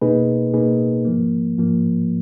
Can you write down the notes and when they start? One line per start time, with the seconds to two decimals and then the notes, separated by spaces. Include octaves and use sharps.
0.02 B2 A#3 D#4 G#4 B4
0.54 B2 A#3 D#4 G#4 B4
1.05 G#2 F3 A#3
1.58 G#2 F3 A#3